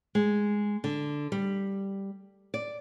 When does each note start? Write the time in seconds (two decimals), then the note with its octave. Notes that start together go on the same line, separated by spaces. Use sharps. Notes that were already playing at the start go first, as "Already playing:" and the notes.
0.15 G#3
0.84 D3
1.32 G3
2.54 D5